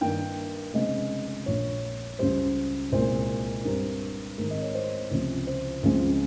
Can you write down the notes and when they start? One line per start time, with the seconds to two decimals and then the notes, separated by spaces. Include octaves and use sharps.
0.01 G2 D#3 A#3 G5
0.74 F1 F2 C#3 G#3 C4 D#5
1.46 A#1 A#2 F3 A#3 C#5
2.19 C#2 C#3 G3 C5
2.92 C2 A#2 G#3 C5
3.64 G2 G3 C4 A#4
4.38 G#1 G#2 D#3 G#3 C4 A#4
4.50 D#5
4.62 C#5
4.74 C5
5.11 C#2 C3 F3
5.47 C5
5.83 C#2 C#3 F3 G#3 C4